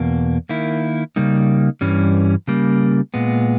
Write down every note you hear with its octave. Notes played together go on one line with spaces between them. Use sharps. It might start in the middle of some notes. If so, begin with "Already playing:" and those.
Already playing: E2 B2 A#3
D#3 A#3 E4
C#3 G3 A#3 D#4
G2 E3 G3 C#4
C#3 G3 A#3
A#2 G#3 B3